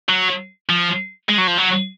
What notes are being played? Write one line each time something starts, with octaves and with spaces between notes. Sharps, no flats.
F#3
F3
G#3
F#3
F3
F#3